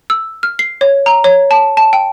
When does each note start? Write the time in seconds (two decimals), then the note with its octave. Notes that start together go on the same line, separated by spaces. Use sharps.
0.10 E6
0.43 F6
0.59 C7
0.81 C#5
1.06 A#5
1.24 C#5
1.51 A5
1.77 A5
1.93 G5